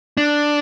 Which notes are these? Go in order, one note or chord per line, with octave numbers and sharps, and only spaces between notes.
D4